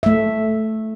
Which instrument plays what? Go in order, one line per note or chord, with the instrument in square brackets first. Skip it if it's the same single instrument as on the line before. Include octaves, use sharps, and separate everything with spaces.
[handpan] A3 E5